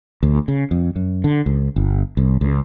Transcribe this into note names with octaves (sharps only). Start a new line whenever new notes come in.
D2
C#3
F2
F#2
D3
C#2
G1
C2
C#2